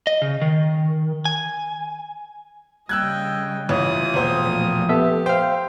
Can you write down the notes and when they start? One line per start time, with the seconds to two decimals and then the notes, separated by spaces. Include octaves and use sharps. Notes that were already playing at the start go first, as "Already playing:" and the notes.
0.07 D#5
0.22 C#3
0.42 D#3
1.25 G#5
2.89 C#3 G3 D#5 G5 E6 F#6 G#6
3.69 A1 E3 F4 C#5 D#6
4.14 E1 A#2 F3 A3 C5
4.89 B3 G4 A4 E5
5.26 C5 F5 G5